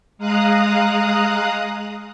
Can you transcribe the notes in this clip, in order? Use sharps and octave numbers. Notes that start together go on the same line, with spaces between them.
G#3 F5 A#5 D#6 F#6